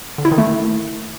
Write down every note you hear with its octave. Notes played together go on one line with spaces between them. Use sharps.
D3
E4
D#3
A3